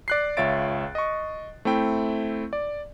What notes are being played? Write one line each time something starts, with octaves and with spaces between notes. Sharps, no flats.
D5 F#6 C7
C#2 F4 C#5 E5 A6 D7
D#5 C#6
A3 C4 E4 G5
D5